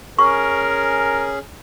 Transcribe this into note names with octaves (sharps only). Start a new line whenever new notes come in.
C#4 G#4 A#4 C#6